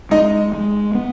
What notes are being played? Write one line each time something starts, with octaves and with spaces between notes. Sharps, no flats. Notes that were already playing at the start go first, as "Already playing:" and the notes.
G#3 D#4 D#5
G#3
B3